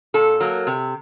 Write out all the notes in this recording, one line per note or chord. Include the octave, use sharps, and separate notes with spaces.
A#2 A4
F#3 A#3
C3